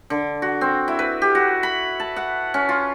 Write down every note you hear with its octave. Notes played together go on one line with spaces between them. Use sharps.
D3
F#4
C4
E4
B4
G4
F#4
B5
A5
F#5
C#4
F4